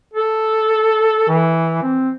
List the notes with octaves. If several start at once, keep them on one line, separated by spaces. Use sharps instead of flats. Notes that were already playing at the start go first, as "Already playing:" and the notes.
A4
E3
C4